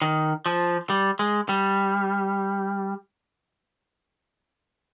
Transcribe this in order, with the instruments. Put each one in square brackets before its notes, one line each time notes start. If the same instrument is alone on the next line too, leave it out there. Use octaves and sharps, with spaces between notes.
[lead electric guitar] D#3
F3
G3
G#3
G3